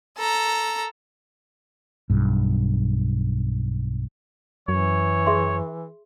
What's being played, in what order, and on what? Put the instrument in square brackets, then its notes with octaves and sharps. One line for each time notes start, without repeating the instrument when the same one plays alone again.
[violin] A4 A#5
[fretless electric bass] B1 G2
[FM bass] F#2 [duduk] E3 [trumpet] C#5
[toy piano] G#4 E5 C6